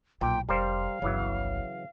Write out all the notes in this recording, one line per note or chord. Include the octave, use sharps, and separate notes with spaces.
B1 A#2 G5
F1 G3 A#4 C5 F5
G1 C2 C#3 E3 F#3